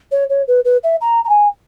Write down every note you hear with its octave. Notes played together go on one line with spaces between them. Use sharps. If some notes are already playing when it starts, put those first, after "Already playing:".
C#5
C#5
B4
B4
E5
A#5
A#5
G#5